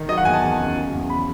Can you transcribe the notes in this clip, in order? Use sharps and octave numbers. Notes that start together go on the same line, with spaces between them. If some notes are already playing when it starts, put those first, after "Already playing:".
Already playing: D#3
F#3 D#5
F#5
E2 G#5
A5
E2
C#3
F#3
E2
B5